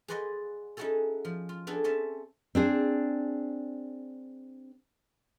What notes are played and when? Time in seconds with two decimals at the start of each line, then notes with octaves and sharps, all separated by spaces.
0.08 G#4 B4 C5 D5 D#5 F#5
0.77 C#4 D#4 E4 F#4 G#4 A4
1.25 F3
1.49 F4
1.67 B3 D4 G#4 A4
1.84 C4 C#4 E5 A5
2.55 C4 D4 G#4